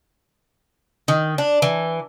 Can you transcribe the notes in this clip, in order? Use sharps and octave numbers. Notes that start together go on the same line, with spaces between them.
D#3
D4
E3